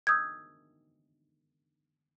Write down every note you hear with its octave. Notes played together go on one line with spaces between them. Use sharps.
D#6 E6 G6 G#6